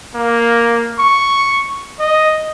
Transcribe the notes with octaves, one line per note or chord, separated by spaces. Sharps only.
A#3
C#6
D#5